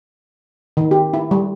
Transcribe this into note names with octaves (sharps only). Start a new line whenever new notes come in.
D#3
G4
E4
G3